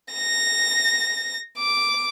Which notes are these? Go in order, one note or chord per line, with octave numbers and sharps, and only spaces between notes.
A#6
D6